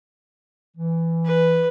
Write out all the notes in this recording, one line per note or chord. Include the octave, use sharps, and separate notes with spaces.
E3
B4